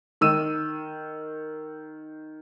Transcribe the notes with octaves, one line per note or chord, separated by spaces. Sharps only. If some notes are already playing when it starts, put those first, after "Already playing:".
D#3 E6 D#7